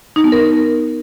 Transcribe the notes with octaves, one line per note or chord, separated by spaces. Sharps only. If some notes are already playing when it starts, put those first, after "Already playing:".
D#4
B3
A#4